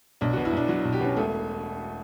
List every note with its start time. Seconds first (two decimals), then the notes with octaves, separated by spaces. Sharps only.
0.21 B1 D4
0.33 F#4
0.37 B2
0.45 E4
0.53 B1 D4
0.69 F#3
0.85 B1
0.93 G4
1.01 B2 C#4
1.17 E1 A3